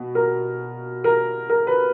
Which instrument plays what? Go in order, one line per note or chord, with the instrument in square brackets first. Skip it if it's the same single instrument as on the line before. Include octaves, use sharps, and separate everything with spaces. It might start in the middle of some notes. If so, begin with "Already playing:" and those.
Already playing: [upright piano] B2
A#4
A#4
A#4
B4